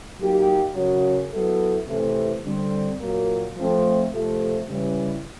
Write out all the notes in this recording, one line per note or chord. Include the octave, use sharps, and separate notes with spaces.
F#3 A#3 D#4 G4
F#2 C#3 F#3
F#3 B3 E4 A4
C3 E3 A3
D3 G3 C4
A#2 F#3 A#3
F3 A3 C4
C3 F3 A3
C#3 E3 G3